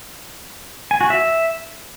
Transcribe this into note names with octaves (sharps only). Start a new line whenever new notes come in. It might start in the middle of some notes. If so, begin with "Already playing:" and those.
G#5
F#4
E5